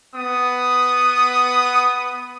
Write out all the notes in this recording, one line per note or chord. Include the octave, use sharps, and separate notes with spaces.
B3 D#6